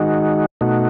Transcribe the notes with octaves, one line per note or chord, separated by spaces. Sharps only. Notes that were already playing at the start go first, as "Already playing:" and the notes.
Already playing: D#3 G#3 D#4 F#4
B2 A3 D#4 F#4